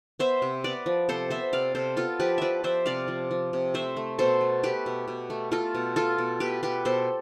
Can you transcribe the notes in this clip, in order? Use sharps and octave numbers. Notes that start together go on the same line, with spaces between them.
B3 C5 E5
C3
B3 B4 D5
F3
C3 A4 C5
B3 C5 E5
C3 D5 F5
C3 A4 C5
B3 F4 A4
F3 G4 B4
F3 B4 D5 E5
F3 C5 E5
C3 D5 F5
F3
F3
C3
A3 C5 E5
A3
B2 A4 C5
A3
A3 G4 B4
B2
B2
A3
A3 F4 A4
B2
B2 F4 A4
B2
B2 G4 B4
B2 G4 B4
B2 A4 C5